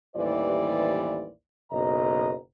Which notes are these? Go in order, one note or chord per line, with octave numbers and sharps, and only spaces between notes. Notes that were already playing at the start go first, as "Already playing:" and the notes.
A1 D#2 E3 G3 C5 D5
F#1 B1 D#5 A#5